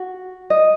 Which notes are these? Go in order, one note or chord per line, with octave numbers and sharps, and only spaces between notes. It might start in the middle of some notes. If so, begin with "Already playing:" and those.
Already playing: F#4
D#5